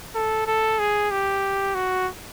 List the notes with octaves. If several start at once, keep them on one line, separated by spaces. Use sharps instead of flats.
A4
A4
G#4
G4
F#4